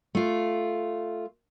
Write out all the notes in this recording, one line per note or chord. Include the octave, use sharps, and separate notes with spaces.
A3 F4